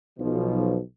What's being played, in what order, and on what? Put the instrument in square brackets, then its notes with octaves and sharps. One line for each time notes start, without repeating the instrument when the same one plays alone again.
[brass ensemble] B1 B2 F3